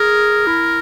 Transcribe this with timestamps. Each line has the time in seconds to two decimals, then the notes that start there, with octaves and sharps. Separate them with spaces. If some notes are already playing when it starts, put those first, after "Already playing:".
Already playing: G#4 A#4
0.47 E4